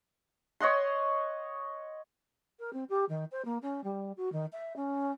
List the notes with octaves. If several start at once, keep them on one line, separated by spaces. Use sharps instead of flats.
C#5 D#5 F#5 C6
A#4
C4
G4
D#3
C5
A#3
C#4
G3
F#4
D#3
E5
C#4